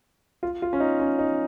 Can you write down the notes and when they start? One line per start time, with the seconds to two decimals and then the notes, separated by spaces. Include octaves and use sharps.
0.43 F4
0.62 F4
0.73 C#4
0.80 D#4
1.00 C#4
1.19 D#4